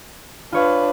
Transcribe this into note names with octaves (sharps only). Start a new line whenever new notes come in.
D4 F4 B4 C#5 F5